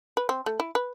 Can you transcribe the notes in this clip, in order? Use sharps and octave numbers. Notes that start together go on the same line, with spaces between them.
B4
C4
A3
E4
B4